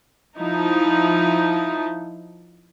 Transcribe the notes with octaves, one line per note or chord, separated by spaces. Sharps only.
F3 D#4 E4